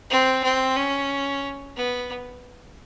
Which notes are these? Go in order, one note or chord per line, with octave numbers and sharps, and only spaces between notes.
C4
C4
C#4
B3